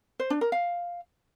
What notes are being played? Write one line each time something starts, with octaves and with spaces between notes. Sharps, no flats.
C5
D4
A#4
F5